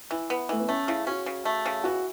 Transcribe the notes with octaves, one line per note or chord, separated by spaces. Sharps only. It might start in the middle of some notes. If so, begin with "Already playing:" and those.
E3 E4
B3
E3 A3
B3
A3 C#4
C#3 E4
C#4 F#4
C#3
A3
C#3
E3 F#4